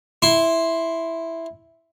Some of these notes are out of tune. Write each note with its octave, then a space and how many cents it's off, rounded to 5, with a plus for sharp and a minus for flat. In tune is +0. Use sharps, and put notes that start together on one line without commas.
E4 +0 C6 +0